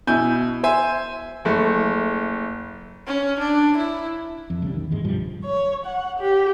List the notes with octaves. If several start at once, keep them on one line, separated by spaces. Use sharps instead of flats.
B2 E4 G#5 G6
C5 E5 G#5
F#1 A3
C#4
D4
E4
F2
C2 C#3 G3
D#3
D#2 G#2 G#3
B1 G2 F3 G3
C#5
F#5
G4